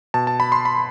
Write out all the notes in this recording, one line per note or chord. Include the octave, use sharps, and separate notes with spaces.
B2 A5
A5
B5
C6
B5